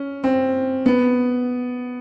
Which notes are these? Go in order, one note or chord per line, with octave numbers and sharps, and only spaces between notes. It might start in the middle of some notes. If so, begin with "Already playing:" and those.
Already playing: C#4
C4
B3